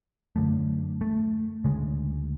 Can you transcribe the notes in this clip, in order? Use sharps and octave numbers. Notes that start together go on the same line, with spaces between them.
F#2 D3 A3
A3
D2 C#3 G#3